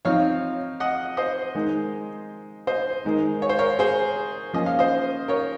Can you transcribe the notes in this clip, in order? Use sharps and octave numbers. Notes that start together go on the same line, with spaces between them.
F3 C4 D#4 C#5 F5
D#5 F#5
C5 D#5
D#3 G#3 D#4
C5 D#5
D#3 G#3 D#4
C#5
C5
A#4 C#5
G#4 C5
F3 A#3 C#4 D#5
F5
C5 D#5
A#4 C#5